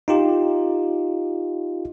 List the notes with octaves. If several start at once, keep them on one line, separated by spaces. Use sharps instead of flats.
D#4 F4 G4